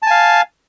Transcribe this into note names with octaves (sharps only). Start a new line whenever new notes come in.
F5 G#5 A5